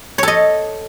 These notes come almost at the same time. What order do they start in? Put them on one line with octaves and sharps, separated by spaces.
C#5 A4 D#5